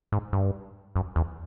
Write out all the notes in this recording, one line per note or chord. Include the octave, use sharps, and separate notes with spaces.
G#2
G2
F#2
E2